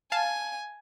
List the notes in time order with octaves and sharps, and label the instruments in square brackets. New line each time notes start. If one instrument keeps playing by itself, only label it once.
[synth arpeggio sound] F5 A5 [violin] G#5